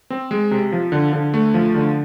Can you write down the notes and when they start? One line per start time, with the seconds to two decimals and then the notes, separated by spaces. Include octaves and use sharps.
0.10 C4
0.31 G#3
0.51 C3
0.72 F3
0.92 D3
1.13 D3
1.34 A3
1.54 F3
1.75 D3